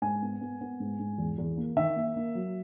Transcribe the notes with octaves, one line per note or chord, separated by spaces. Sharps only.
G#2 G#5
B3
B3
B3
G#2
G#2
E2
E2
A#3
D#3 E5
A#3
A#3
F#3